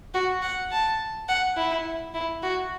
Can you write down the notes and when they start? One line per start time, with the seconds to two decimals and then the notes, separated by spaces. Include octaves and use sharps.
0.14 F#4
0.43 F#5
0.72 A5
1.29 F#5
1.57 E4
2.14 E4
2.43 F#4